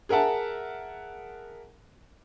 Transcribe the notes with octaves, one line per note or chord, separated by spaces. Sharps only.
G#4 A#4 E5 F#5 A5